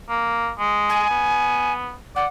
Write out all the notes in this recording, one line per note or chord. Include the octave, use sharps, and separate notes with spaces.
A#3
G#3
G#5
B3
D5 F#5